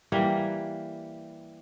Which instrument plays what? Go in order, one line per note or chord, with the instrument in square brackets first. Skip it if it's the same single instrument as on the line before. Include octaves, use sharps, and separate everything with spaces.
[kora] E3 G3 A#3